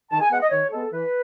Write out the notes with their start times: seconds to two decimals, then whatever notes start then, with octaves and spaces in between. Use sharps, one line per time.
0.11 D#3 A5
0.21 G#5
0.31 G#3 B3 F#5
0.41 D#5
0.51 D#3 C#5
0.71 G#3 B3 A4
0.92 E3 B4